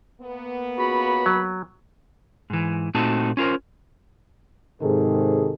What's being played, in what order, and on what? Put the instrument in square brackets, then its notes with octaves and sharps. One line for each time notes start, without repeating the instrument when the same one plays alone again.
[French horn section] A#3 B3
[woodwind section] C#2 F#4 B5
[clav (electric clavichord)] F#3
[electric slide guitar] G#2 E3
A#2 A3 C4 D#4 F#4 A5
C#4 F4 A#4 C5
[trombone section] G#2 C3 D#3 G#4 A4